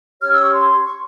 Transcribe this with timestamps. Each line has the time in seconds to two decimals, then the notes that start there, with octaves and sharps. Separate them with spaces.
0.21 C#4 G4 C#5 F6
0.32 E6
0.42 C#6
0.53 C6
0.85 C#6